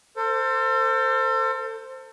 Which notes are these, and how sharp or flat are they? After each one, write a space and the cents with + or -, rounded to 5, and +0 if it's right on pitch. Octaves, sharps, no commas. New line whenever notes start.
A4 +35 C5 +0